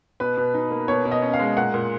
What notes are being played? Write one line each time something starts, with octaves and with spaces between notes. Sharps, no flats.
B2 B4
B2
D#4
A#3
B2 C#5
B2
D#5
C#4
F5
G#3
A#2 F#5
A#2